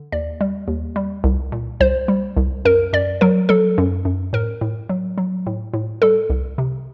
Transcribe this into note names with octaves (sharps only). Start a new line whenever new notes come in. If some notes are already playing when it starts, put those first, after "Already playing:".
Already playing: D3
D#2 D5
G3
D#2
G3
C2
A#2
C2 C5
G3
C2
F#2 A#4
F#2 D5
F#3 A#4
F#3 A4
F#2
F#2
A2 A#4
A2
F#3
F#3
A2
A2
G3 A4
C2
C3